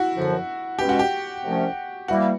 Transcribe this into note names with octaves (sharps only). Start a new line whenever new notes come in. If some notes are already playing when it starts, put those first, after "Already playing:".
Already playing: E4 F#4
F#2 D3 F3
B2 G#3 C#4 G4
F#4
G4
C2 C3 F3 A3 C#4
E3 G3 A#3 F#4